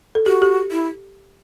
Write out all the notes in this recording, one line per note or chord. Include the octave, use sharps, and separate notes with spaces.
A4
F#4 G4
G4
E4